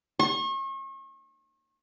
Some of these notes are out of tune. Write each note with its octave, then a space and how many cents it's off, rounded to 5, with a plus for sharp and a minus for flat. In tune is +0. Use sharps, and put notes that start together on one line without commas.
C#6 -40